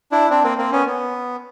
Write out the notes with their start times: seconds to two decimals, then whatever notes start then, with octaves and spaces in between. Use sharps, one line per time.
0.12 D4 E4
0.30 C4 D4
0.44 A#3 C4
0.58 A#3 C4
0.72 B3 C#4
0.86 B3